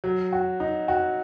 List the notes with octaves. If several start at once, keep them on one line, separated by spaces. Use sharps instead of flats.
F#3
F#4
D#4
F#4